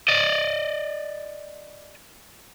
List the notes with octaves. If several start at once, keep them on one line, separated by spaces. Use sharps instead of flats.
D5 D#5